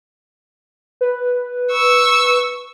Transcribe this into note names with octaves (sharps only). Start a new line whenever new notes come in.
B4
C#6 E6